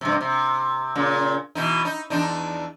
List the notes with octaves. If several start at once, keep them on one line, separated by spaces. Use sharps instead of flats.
G2 C3
C3
A#2 C#3
B2 E3 D#4
D#4
E2 D4 D#4